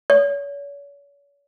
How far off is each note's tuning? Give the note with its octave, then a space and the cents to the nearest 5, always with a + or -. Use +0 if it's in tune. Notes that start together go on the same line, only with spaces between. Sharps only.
C#5 +40